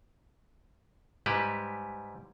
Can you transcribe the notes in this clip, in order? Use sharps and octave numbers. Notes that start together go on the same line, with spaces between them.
G#2 G3 E4 G4 B4